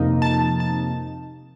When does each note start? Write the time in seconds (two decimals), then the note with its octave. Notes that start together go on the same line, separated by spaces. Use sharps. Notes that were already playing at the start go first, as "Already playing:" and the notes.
Already playing: F2 C3 F3 A#3 D#4
0.22 A5
0.60 A5